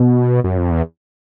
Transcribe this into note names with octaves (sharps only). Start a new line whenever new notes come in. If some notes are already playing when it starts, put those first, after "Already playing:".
Already playing: B2
F#2
F2
E2